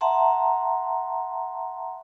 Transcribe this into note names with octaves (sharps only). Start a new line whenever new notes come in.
E5 F#5 A5 A#5 C6